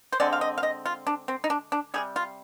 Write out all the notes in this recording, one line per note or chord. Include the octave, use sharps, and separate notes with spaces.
C5
D3 G#3 C4 D5
F5
D#5
F5
D#5
F4
D4
C4
D#4
D4
D4
C3 D#3 G3 G#4
F4